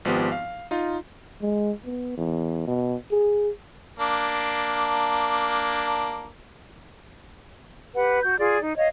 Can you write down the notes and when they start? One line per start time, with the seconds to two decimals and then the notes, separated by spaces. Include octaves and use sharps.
0.05 G#1 F3 B3 G4
0.32 F5
0.71 D#4 F4
1.41 G#3
1.85 B3
2.17 E2
2.67 B2
3.11 G#4
3.99 A#3 D4
7.95 G4 B4 F#5
8.22 F#4 G6
8.39 F4 G#4 D5
8.61 D#4
8.77 C#5 D#5 F5